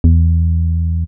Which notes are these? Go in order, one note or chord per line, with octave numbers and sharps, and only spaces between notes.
E2